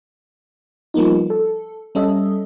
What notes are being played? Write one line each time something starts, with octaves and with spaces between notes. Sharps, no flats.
F3 G3 A#3 B3 D#4
A4
G3 C#4 A4 D#5 E5